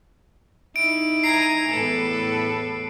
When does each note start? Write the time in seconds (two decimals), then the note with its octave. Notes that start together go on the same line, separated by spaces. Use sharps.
0.76 D#4 E4 D7
1.24 G#5 A#5 C7
1.70 E2 A2 A4 B4